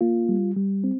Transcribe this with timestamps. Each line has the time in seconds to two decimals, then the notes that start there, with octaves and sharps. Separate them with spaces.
0.01 A#3 F4
0.29 G3
0.56 G3
0.84 C4